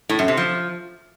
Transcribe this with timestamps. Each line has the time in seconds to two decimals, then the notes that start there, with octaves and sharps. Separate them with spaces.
0.09 A2
0.19 F#2
0.28 C3
0.37 F3